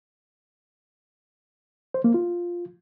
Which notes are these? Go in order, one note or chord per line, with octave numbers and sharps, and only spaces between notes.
C5
A#3
F4